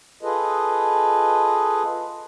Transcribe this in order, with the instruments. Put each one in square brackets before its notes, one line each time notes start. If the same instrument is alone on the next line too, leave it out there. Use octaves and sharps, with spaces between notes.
[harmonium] F4 G#4 A4 B4 D#5